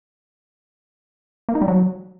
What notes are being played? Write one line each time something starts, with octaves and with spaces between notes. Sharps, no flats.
A#3
D#4
G3
F#3